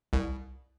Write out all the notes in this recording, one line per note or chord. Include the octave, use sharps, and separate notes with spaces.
C2